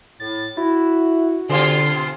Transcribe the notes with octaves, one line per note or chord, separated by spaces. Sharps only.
A2 A6
E4 F#4
B2 D3 F4 C6